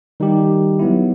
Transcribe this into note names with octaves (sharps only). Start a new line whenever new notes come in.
D#3 G3 D#4 G4
F#3 B3 E4